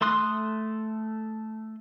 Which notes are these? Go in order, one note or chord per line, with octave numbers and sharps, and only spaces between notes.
A3 A4 C6 D#6 F#6